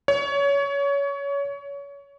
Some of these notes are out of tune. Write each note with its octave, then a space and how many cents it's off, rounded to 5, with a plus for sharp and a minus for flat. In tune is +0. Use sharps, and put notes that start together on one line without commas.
C#5 +25